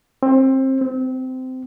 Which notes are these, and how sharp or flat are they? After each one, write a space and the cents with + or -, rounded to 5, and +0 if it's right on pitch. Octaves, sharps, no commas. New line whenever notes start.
C4 +25
C4 -20